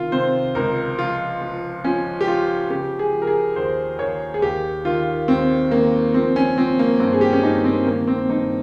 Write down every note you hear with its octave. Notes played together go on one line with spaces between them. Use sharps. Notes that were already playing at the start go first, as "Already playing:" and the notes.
Already playing: C3 D#3 F4
C3 C5
C#2 A#4
F3 F4
F3
F3 C#4
G4
F3 F4
C#3 G4
G#4
F3
A#4
G#4
D#2 C5
D#2 C#5
G#4
D#2 G4
D#3 F4
D#2 C4
D#3 A#3
F3 C4
C#4
F3 C4
A#3
G2 C4
G#4
G4
C#4
G2 D#4
C4
D#3 A#3
C4
G2 D#4